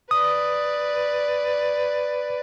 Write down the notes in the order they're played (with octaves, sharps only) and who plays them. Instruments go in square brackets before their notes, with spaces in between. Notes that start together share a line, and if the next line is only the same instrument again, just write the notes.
[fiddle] B4 D5 [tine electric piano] D#6